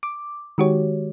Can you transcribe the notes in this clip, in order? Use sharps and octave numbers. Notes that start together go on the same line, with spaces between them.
D6
D#3 G#3 F#4 G4 C#5